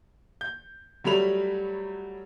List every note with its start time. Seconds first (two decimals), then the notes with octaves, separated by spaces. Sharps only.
0.41 G6
1.04 F#3 G3 A3 B5 F7